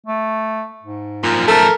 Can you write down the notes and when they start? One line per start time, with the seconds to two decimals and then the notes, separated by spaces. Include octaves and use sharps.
0.06 A3
0.83 G#2
1.23 F#2 A#2 F3
1.48 A3 A4 A#4